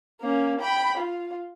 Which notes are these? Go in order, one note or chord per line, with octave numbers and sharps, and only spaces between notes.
A#3 C#4
G5 B5
F4